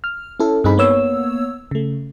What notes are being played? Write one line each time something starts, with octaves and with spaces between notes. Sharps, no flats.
F6
C#4 E4 A4
G2 C4 D#4 G#4 B5
A#3 B3 C#5 E6
C#3 A3